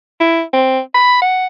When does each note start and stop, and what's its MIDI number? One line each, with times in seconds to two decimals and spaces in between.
0.20 0.42 64
0.53 0.80 60
0.95 1.18 83
1.22 1.47 78